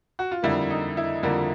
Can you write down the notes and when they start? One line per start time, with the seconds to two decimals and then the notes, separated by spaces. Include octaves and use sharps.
0.19 F#4
0.31 F4
0.42 F2 D3 G3 A#3 E4
0.70 D#4
0.97 E4
1.23 F2 D3 G3 A#3